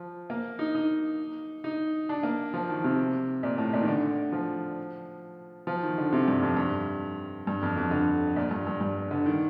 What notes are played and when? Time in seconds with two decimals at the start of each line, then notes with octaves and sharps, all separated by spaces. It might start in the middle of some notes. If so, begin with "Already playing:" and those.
Already playing: F3
0.30 A#3
0.59 D#4
0.75 D#4
1.64 D#4
2.09 D4
2.23 A#3
2.54 F3
2.69 D#3
2.84 C3
3.43 A#2
3.58 A2
3.73 A#2
3.82 D#3
3.88 D3
4.32 F3
5.67 F3
5.83 D#3
5.98 D3
6.13 C3
6.28 G2
6.42 F2
6.57 G2
7.47 G2
7.62 F2
7.77 F2
7.91 D3
8.36 A#2
8.51 G2
8.67 G2
8.81 G2
9.11 D3
9.26 D#3